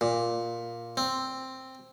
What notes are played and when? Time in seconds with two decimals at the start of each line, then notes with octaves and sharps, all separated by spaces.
0.01 A#2
0.97 C4